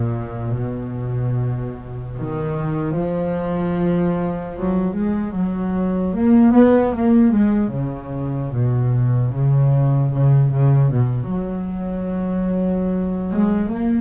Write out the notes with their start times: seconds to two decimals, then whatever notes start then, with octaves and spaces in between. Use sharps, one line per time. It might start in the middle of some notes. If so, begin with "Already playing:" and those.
Already playing: A#2
0.58 B2
2.17 D#3
2.97 F3
4.56 F#3
4.96 G#3
5.35 F#3
6.15 A#3
6.54 B3
6.94 A#3
7.34 G#3
7.74 C#3
8.54 B2
9.33 C#3
10.13 C#3
10.52 C#3
10.93 B2
11.32 F#3
13.31 G#3
13.70 A#3